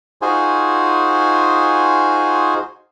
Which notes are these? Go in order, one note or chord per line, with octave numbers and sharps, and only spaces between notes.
D#4 F4 F#4 G#4 C5 G#5